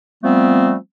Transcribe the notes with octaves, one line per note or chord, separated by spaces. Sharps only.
F3 G3 A3 B3 C4